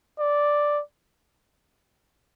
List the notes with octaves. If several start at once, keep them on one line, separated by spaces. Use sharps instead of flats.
D5